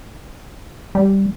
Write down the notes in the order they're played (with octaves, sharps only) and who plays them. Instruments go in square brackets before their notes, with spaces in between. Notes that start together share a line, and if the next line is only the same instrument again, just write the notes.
[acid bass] G3